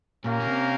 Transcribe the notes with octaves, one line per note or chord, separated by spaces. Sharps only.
A#2 A#3 C#4 G4 A#4 F5
A#2
C3